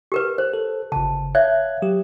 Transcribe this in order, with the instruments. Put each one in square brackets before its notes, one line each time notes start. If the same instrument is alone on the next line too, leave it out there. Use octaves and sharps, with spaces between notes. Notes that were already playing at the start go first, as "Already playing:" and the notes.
[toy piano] G4 A#4 B4
C5
[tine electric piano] A4
[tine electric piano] G1 C#3 [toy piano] A5
[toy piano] C#5 E5 [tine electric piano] F5 F#6 G#6
[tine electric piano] F#3 G4